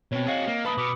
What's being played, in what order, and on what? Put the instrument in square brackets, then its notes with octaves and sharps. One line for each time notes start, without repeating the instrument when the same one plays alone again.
[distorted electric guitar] B2 [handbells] C4 C#5
[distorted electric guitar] F#4 G#4 [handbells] D#5 F5 A6
[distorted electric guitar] A#3
[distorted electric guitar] A#3 A4 [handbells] B4 B5 D#6
[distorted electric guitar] B2 [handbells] D6 D#6 C#7